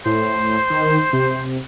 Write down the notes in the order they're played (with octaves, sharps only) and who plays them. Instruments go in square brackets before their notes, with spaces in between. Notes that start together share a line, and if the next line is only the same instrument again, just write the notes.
[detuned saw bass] A2 [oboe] C5
[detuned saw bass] D#3
C3